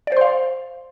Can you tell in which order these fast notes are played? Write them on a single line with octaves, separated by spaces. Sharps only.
D5 C5 C6 F5